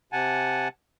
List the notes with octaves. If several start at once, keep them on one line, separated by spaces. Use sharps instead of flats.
C3 F#5 G#5 A5